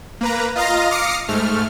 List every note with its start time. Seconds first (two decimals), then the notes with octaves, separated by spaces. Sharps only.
0.21 A#3 B4 A#5
0.55 F4 D#5 F5 A#5 A#6
0.90 D6 D#6 F6 A#6 C7 C#7
1.28 G#2 A3 F6